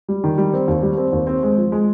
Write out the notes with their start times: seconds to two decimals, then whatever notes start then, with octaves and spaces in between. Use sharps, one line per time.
0.08 G3
0.24 D#3
0.38 G3
0.53 C4
0.68 D#2
0.83 G3
0.97 C4
1.12 D#2
1.27 C4
1.43 G#3
1.58 F3
1.72 G#3